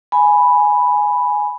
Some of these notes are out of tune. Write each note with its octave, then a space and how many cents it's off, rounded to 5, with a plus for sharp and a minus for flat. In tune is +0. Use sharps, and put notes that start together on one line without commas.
G#5 +0 B5 +0